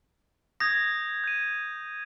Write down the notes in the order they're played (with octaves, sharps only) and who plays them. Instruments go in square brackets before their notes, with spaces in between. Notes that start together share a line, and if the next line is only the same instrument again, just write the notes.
[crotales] D#6 G6 G#6 [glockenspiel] A#6
[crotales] G6 D#7